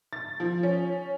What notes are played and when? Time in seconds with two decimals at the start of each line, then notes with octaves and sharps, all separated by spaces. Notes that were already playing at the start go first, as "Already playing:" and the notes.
0.13 A6
0.40 F3
0.63 C#4